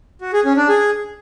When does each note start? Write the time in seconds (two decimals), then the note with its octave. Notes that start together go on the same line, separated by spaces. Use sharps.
0.21 F#4
0.33 G#4
0.45 C#4
0.57 D4
0.69 G#4